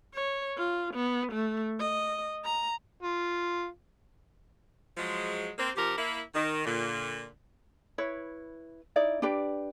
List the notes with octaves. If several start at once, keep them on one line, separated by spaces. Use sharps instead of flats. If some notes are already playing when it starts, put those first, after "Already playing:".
C#5
F4
B3
A3
D#5
A#5
F4
F3 F#3 G#3
A#3 C4
C3 F3 G4 A#4
A#3 E4
D#3
A#2 D3
E4 B4 C#5
D#4 E4 D5
D4 G4 B4 D5